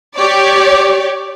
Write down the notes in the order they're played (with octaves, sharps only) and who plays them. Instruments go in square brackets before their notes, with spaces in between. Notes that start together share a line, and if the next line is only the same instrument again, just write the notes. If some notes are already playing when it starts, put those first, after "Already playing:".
[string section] G4 C#5 D5